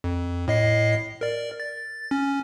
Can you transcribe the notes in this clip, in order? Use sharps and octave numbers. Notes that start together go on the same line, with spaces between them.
F2
A2 D#5 C7
A#4 D5
A6
C#4